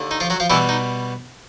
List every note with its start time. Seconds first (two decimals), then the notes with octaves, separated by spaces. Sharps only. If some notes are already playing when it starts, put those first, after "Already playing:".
Already playing: D#2 D3
0.11 D#4
0.20 F3 F4
0.30 F#3 F#4
0.40 F3 F4
0.50 B2 E3 G3 B3 E4
0.69 D#4